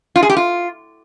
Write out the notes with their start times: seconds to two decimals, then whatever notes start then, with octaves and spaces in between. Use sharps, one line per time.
0.16 F4
0.23 G#4
0.30 G4
0.37 F4